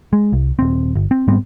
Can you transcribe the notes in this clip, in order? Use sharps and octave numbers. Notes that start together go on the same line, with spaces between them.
G#3
C2
D#1 C4
G1
C4
G#2 G3 B3 C4